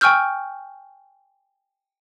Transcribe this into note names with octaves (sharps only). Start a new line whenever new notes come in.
G5 G#5 C#6 E6 F6 G6